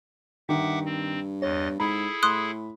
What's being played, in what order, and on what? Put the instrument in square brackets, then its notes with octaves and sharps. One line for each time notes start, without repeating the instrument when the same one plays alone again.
[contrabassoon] G2 [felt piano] D#3 [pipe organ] E5 F#5 D6
[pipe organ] C4
[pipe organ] E2 D#5 A6 [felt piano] C#5
[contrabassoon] G#2 [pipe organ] E4 G#4 A4 [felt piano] B5
[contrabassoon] A2 [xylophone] C6 D#6 F#6